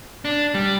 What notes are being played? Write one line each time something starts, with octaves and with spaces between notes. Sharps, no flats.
D4
G3